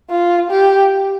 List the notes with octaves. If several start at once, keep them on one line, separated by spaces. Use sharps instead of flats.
F4
G4